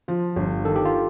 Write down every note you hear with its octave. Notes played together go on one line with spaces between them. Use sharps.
F3 F4
G1
D#3 A4
G4
F4